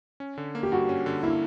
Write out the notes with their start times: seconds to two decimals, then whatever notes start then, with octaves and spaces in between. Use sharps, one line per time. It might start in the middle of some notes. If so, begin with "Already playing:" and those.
0.20 C#4
0.38 D3
0.55 A#3
0.63 G4
0.72 G2 F#4
0.89 C#4
1.06 D3
1.23 A#3 E4